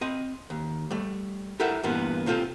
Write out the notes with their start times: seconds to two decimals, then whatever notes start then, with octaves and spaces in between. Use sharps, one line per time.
0.01 C4 D#5
0.50 D#2
0.91 G3 A3
1.60 E4 G4 A4 A#4 E5 F#5
1.83 G2 A#2 E3 A#3 B3
2.26 C3 C4 F4 A4 G5